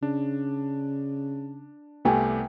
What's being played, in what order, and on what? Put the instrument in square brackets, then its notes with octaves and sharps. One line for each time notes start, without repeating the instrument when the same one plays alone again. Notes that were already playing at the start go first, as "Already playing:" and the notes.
[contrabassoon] C#3 [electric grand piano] D4
[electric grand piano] C2 A3 G4 [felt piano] B3 G5 G#5